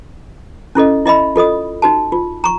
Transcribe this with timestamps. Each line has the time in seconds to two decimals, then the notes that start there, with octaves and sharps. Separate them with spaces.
0.75 C#4 E4 A4 D#5
1.06 E4 D#5 E5 B5
1.36 F4 A4 D#5 D#6
1.82 D#4 F#4 A5
2.12 F4
2.44 A#5 C#6